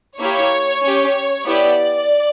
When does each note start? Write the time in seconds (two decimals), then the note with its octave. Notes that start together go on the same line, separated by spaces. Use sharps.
0.20 A#3 E4 G4 C#5
0.83 C#4 G4
1.45 B3 E4 G4 D5